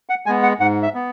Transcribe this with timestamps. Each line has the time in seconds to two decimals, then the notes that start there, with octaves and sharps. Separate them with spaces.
0.09 F#5
0.26 G#3 B3 G#5
0.43 F#5
0.60 G#2 F#5
0.83 E5
0.94 B3